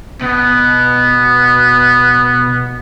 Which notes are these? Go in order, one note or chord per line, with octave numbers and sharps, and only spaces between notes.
B2 B3